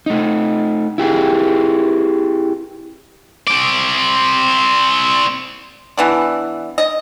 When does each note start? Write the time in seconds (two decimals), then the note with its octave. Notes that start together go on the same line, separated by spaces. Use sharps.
0.06 A3 D#4
0.98 E4 G4 G#4
3.47 C4 D5
5.97 E3 B3 D4
6.78 D#5